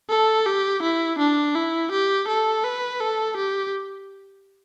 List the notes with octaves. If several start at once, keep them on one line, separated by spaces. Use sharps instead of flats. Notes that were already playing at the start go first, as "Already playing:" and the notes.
A4
G4
E4
D4
E4
G4
A4
B4
A4
G4